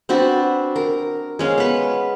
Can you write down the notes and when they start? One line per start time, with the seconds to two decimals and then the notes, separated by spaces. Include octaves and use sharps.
0.09 C4 D4 F#4 B4
0.76 A#4
1.39 G#3 C#4 F5
1.58 B3 B4